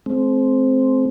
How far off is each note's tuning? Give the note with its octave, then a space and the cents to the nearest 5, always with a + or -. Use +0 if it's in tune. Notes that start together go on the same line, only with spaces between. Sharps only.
A3 -45 C4 +0